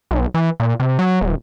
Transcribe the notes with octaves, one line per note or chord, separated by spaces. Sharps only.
B1
E3
A#2
C3
F#3
D#1